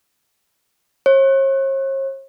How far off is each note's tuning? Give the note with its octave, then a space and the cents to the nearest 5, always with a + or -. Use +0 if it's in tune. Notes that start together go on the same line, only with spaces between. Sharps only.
C#5 -45